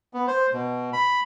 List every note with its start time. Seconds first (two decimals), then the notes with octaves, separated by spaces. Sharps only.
0.14 B3
0.27 C5
0.53 B2
0.93 B5